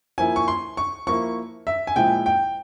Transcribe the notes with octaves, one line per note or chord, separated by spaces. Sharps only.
F3 A#3 E4 G#5
C#6
C6
C#6
F3 A#3 E4 C#6
E5
G#5
A#2 F3 G#3 E4 G5
G5